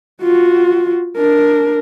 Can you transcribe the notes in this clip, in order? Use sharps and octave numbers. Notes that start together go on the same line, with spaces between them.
F4 F#4
D4 A#4